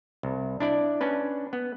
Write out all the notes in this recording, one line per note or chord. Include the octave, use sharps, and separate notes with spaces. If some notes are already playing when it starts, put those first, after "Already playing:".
C2
D4 E4 D5
C#4 D4 B4
B3